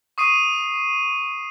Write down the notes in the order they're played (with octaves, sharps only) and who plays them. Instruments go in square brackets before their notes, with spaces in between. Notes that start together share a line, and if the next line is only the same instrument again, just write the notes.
[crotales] C#6 D#6 C7 D#7